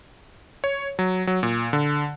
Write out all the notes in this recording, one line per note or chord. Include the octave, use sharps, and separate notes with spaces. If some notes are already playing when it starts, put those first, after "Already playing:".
C#5
F#3
F#3
A#2
D3